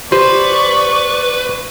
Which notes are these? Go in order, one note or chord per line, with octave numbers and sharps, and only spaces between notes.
G4 B4 C5 D5 C#6